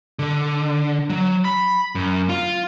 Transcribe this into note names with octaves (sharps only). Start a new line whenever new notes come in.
D3
F#3
B5
F#2
F4